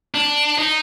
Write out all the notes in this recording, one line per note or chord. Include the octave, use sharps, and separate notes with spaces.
D4
D#4